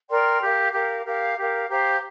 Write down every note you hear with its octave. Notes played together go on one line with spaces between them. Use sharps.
A#4 D5 G5 C6
G4 A#4 F5
G4 A#4 F5
G4 A#4 F5
G4 A#4 F5
G4 C5 F5 A#5